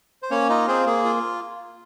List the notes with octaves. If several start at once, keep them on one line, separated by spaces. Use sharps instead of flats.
C5
A#3 C#4 C#5
D#4 F4 D#5
C4 G#4 C5
A#3 G#4
F4